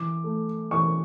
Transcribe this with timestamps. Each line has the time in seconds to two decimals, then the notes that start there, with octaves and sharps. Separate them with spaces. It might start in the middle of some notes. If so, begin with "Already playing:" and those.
Already playing: E3 D6
0.24 A3
0.71 E3 C#6